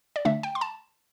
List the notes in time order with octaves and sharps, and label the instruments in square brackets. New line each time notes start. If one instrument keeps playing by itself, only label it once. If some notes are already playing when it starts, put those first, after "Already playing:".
[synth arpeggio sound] D5
D3 A3 D4 E5
G5
C6
A5